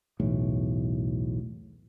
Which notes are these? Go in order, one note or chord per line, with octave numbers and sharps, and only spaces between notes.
B1 E2 A2